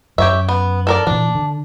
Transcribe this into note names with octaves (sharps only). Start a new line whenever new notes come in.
F#2 G4 C#5 E5
B3
A4 A#4 D5
A#2 E3 D4
D3